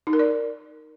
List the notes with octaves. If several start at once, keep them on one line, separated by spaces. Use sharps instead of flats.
D#4
A#4
D5